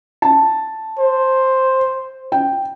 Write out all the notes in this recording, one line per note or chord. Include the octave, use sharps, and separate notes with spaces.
A5
C5
G5